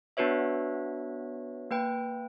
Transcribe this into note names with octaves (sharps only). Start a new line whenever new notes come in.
B3 D4 F#4 B4 C#5 E5
A#3 B4 G5